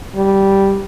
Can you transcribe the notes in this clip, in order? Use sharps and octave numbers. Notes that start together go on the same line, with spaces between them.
G3